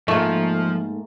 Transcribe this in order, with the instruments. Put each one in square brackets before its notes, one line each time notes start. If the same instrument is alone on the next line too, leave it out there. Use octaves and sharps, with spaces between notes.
[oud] G#2 A#3 [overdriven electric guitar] F3 [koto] A3